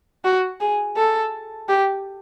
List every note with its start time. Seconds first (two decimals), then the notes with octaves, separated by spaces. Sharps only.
0.24 F#4
0.60 G#4
0.97 A4
1.69 G4